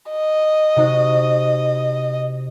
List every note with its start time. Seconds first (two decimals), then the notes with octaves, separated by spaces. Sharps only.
0.10 D#5
0.76 C3 D#4 F#4